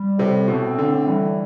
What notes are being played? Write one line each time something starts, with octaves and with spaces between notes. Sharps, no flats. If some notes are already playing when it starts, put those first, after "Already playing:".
Already playing: G3
A2 C3
B2 C4
A2 D3
E3 G3